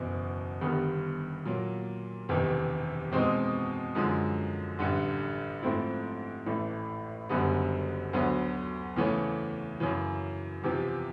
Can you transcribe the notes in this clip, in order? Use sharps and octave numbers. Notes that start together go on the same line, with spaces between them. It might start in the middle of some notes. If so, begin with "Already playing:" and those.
Already playing: F#1 E2 B2
G1 G2 D#3 G3 B3
A#2 F#3 A#3
E1 E2 C3 D#3
E2 B2 G#3 C4 D#4
F#2 D3 F3 G#3
A1 G2 D3
G#2 F3 A3 C4 E4
A1 A2 E3 A3
F#1 F#2 D3 G3 B3
D2 D3 F#3 B3
E2 C#3 E3 A3 C#4
F#2 C#3 E3
E2 C3 F3